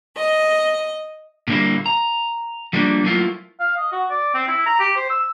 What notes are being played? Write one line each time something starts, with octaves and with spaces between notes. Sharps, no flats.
D#5
A#2 D3 G3 A3 A#3 E4
A#5
F3 G3 A3 A#3 D4
F#3 A3 A#3 E4 F4
F5
D#5
F#4
D5
C4
E4
A#5
G4
C5
E6